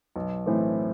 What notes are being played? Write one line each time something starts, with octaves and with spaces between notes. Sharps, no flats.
B1
A2 E3 A3 C4